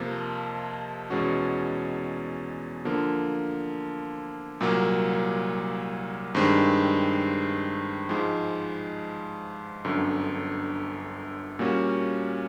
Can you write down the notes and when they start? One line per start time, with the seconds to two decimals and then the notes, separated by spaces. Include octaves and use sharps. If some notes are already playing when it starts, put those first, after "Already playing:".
Already playing: F2 C3 F3 A#3
1.10 E2 B2 G#3 C#4 F#4
2.85 D3 F3 A#3
4.61 C2 A#2 F#3 A#3
6.35 G2 D#3 G#3 C4
8.09 G#2 F3 G#3
9.85 G1 F#2 D3
11.59 A#2 G3 A#3 C#4 F#4